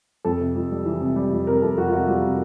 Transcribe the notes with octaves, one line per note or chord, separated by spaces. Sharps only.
F2 A4
C3
F2
G3
E3
C3
G3
F2
C3 A#4
F2 A4
F2 F#4
F4
C3 F#4
G3 F4
C3